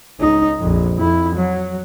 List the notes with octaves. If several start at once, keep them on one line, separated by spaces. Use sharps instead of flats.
C#2 D#4
A#1 F2
F2 E4
F#3